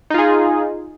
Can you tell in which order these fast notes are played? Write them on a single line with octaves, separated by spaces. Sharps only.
D#4 F4 G#4